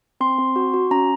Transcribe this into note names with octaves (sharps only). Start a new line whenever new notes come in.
C4 C6
C4
F#4
F#4
C#4 A#5